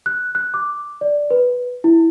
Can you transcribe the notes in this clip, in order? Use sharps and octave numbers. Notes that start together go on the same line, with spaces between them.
F#6
F#6
D6
D5
B4
E4